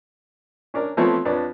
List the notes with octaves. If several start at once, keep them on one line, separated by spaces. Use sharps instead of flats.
C#4 D4 A#4
F3 A3 B3 C4 E4 C#5
F2 D4 B4 C#5